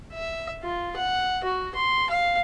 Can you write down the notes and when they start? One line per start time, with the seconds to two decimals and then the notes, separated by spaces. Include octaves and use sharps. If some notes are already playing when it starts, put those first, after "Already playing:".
0.13 E5
0.63 F4
0.96 F#5
1.44 F#4
1.75 C6
2.10 F5